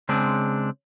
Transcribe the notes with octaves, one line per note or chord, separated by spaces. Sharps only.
C#3 G#3 C4 D4